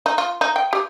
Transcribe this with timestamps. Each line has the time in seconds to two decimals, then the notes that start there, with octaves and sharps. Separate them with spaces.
0.06 D#4
0.18 F4
0.41 D#4
0.56 G5
0.73 G4